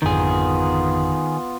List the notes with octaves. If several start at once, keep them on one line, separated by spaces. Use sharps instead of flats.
G#1 F2 D3 D#3 B3 F4 G#4